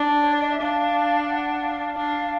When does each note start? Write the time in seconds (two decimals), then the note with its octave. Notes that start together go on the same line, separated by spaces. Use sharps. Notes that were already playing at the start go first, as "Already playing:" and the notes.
Already playing: D4
0.21 C#5
0.31 D5
0.41 D#5
0.51 E5
0.61 D4 F5
1.28 F#5
1.62 F5
1.96 D4